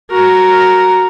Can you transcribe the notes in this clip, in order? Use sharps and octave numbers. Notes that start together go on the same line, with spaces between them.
F#4 A#4